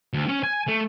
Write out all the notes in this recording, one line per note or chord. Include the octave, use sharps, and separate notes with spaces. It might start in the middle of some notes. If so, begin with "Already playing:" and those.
D2
C#4
G#5
A3